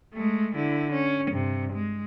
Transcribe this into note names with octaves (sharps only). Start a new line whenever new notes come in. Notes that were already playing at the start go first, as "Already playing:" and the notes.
G#3 A3
D3 E4
C#4
G2 C3
G#3